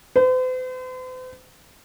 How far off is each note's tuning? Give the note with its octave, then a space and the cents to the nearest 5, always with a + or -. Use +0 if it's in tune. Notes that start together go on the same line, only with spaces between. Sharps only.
C5 -45